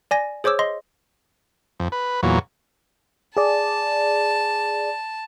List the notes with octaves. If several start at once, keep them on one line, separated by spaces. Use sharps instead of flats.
D5 G#5 A#6
G#4 C5 C#5 D6 E6
D#5 C6
F2
B4
E2 A#2 F#3
G#4 D5 A5